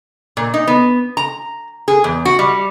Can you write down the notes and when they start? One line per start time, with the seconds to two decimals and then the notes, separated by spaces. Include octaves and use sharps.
0.37 A#2
0.54 D#4
0.67 B3
1.17 A#5
1.88 G#4
2.04 E2
2.25 F#4
2.39 G3